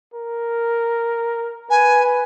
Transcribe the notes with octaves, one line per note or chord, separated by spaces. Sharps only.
A#4
B4 G#5